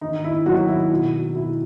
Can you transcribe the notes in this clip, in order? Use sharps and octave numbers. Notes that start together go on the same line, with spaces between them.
D#3 D#4
E4
D#3 F#3 F#4
E4
B2
B2 E4